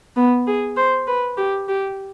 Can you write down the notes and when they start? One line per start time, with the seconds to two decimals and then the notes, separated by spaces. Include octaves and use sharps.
0.16 B3
0.47 G#4
0.77 C5
1.07 B4
1.37 G4
1.68 G4